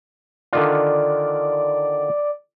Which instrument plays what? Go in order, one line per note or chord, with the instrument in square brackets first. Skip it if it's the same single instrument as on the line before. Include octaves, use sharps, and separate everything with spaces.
[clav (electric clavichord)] D3 D#3 F4 [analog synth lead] D5